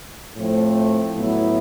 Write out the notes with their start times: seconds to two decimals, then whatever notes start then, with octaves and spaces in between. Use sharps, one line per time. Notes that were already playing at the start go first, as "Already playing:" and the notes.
0.36 A2 F3 A3 C4
1.15 A2 F#3 B3 E4